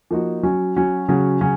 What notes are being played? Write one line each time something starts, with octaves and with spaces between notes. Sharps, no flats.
F3 A#3 D#4 F#4
F#3 C#4 F#4
F#3 C#4 F#4
C#3 F#3 C#4 F#4
C#3 F#3 C#4 F#4